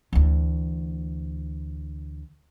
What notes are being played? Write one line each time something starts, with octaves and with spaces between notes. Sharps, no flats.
D2 E3